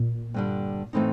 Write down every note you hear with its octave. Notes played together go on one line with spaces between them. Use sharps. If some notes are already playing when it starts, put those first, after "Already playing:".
Already playing: A#2
G2 D3 G3
A2 E3 A3 C4 D#4